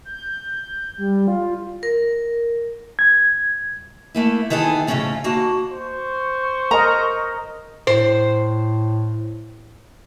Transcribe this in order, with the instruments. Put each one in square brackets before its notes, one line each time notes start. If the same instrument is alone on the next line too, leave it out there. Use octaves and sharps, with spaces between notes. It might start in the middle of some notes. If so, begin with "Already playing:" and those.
[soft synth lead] G6
G3
F4
[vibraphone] A#4
[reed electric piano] G#6
[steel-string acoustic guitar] A3 A#3 E4
D#3 E3 E4 G#4 A4
A2 C#3 F3 C#4 F4
D#2 A#3 F#4 A5
[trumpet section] C5 C#6
[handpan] A#4 D#5 [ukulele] A#5
[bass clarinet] A2 [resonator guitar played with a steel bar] C5